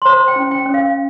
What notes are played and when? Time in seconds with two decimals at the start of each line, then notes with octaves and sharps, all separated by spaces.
0.02 C6
0.05 C5 A#5
0.28 G5
0.36 C#4
0.51 G5
0.66 C#4
0.74 F5